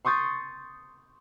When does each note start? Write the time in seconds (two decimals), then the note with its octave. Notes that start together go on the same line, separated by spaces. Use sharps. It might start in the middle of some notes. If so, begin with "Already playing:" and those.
0.05 C6 C#6 D#6 G6 A6